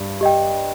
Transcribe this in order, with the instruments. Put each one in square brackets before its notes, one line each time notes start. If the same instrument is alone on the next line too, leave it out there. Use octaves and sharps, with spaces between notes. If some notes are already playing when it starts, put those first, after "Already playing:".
Already playing: [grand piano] G2 [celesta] G4
[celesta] G4 D#5 G5